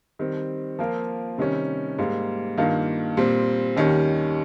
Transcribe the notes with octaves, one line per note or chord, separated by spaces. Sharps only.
D#3 G3 C4
F3 A#3 F4 A#4
C3 D#3 G3 C#4
G#2 G3 A#3
G2 D#3 A#3 F4
A#2 G3 C4
D#2 D#3 G3 C#4